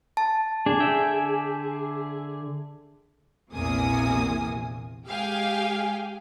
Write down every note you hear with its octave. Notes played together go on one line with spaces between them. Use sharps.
A5
D4 G#4
D3 E5 G5
A#1 E2 C3 A#3 G#5 D#6
G#3 G4 G#4 F5 G5 G#5